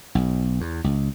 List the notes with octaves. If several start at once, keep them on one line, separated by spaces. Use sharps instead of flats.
B1
E2
C#2